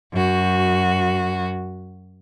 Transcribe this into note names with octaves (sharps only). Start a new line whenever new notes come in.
F#2 F#4